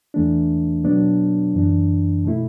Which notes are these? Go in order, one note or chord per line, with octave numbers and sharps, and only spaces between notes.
E2 E3 A3 D4
B2 F#3 B3 D4
F#2 E3 D4
B2 A3 E4